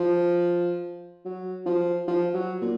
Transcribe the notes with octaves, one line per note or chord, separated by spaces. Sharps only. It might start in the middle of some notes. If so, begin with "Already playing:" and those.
Already playing: F3
F#3
F3
F3
F#3
A#2